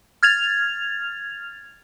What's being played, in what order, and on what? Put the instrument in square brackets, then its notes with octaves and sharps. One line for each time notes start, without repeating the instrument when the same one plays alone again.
[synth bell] F6 G#6 A6 F7